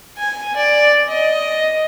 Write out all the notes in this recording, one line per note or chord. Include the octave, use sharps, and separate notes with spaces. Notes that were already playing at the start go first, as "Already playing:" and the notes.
G#5
D5
D#5